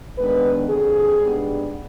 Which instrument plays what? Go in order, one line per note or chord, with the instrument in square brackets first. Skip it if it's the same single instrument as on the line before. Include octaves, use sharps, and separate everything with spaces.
[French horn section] D#2 D#3 G#3 B3 D4 B4
F2 D3 G3 C4 G#4
G#2 G3 B3 D4